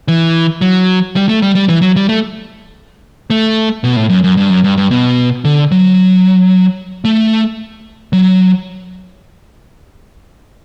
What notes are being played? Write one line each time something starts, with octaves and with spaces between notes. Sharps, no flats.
E3
F#3
G3
A3
G3
G3
E3
F#3
G3
A3
A3
B2
A2
F#2
F#2
G2
F#2
G2
G2
B2
D3
F#3
A3
F#3